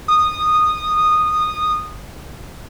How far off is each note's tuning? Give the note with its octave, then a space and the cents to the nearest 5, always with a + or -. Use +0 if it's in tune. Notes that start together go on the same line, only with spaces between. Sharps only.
D#6 -15